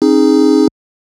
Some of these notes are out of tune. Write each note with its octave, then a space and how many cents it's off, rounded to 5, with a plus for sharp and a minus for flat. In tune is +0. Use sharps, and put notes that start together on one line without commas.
C4 +45 D#4 +0 G#4 +0